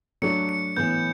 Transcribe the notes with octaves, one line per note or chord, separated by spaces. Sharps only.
F#3 A3 D4 F#4 C#7
C#7
A2 E3 B3 G6